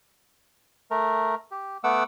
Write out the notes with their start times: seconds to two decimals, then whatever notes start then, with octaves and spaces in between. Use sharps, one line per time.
0.91 A3 A#4
1.51 G4
1.84 A3 B3 F#5 D6 E6